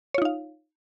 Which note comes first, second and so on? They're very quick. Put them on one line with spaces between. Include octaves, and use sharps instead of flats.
C#5 F4 D#4 F5